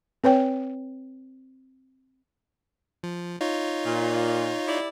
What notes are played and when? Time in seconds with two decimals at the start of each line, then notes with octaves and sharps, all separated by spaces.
0.24 C4 B4 C#5 G5
3.03 F3
3.41 D#4 F4 C#5
3.84 A#2
4.67 E4 G4 D5